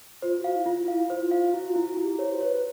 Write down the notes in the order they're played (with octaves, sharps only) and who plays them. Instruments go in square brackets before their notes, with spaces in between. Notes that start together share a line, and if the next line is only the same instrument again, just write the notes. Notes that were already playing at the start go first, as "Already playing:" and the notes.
[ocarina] F4 [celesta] C5
[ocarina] F#4
[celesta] F5
[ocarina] E4
[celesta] F4
[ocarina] E4 [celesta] F5
[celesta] C5
[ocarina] F4
[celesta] F5
[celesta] E4 [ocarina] F#4
[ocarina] F4
[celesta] E4
[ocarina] F#4
[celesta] E4
[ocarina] G4
[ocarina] C5 [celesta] C#5
[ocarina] C5
[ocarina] B4 [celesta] C#5